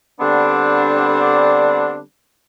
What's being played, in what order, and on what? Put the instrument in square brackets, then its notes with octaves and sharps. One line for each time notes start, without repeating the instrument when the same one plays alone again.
[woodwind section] D3 G3 B3 C4 D4